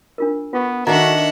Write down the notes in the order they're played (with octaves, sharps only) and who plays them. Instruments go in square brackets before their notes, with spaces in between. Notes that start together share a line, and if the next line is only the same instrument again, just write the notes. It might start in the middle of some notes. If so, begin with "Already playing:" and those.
[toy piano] D4 F4 A#4
[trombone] B3 [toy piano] F4 C#6
[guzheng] D#3 D4 [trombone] F#4 [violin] E5 F#5 [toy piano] A#5 C#6